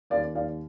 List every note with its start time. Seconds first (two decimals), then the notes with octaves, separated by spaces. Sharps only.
0.10 D#2 D5 F5
0.35 D#2 D5 F5